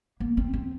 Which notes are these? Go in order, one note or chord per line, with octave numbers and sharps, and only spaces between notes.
A#3
C4
C4